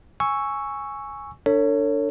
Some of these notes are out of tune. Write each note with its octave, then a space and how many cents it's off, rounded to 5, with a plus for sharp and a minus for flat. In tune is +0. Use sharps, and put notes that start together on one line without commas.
G#5 +0 C#6 +0 E6 +0
D4 +0 A4 +45 C#5 +5